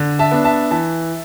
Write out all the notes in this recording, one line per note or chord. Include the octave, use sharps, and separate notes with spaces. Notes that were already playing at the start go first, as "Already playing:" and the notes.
Already playing: D3
E5 A5
B3 D4
E5 A5
E3 E5 A5